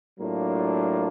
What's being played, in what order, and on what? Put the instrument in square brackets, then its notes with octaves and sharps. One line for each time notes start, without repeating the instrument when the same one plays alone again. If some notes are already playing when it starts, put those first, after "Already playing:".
[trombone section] A2 F#3 A#3 D4 F4